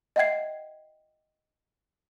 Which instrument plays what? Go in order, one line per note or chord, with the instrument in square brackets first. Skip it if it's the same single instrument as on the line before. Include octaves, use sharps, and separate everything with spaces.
[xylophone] D#5 E5 F#5 G5 G#6 C7